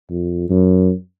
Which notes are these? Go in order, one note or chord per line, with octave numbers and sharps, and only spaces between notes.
F2
F#2